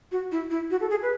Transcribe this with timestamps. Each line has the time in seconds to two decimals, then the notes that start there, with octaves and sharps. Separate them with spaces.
0.12 F#4
0.32 E4
0.51 E4
0.70 F#4
0.81 A4
0.90 G#4
1.02 B4